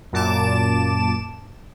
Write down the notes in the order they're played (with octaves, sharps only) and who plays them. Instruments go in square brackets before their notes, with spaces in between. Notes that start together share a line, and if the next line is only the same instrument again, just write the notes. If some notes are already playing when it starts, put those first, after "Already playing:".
[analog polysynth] F#2 A#2 A5 D6 E7